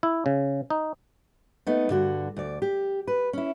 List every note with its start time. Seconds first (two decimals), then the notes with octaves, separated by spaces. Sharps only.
0.03 E4
0.26 C#3
0.70 D#4
1.67 A3 B3 D#4
1.89 G2 D3 F#4
2.37 D2 D5
2.62 G4
3.07 B4
3.33 C#4 E4